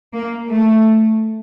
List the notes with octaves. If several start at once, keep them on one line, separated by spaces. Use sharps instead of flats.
A#3
A3